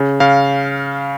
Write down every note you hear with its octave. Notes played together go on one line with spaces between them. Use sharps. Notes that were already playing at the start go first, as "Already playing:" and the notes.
Already playing: C#3
C#3 F5